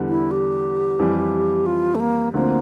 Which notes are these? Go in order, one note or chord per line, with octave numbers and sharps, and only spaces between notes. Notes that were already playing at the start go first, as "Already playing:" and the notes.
Already playing: E2 D3 G3
E4
G4
F2 E3 G3
F4
A3
A#3
D2 D3 F3 A#3 C4